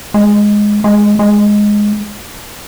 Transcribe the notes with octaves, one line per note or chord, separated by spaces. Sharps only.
G#3
G#3
G#3